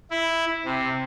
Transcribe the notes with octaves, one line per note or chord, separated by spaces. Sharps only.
E4
C3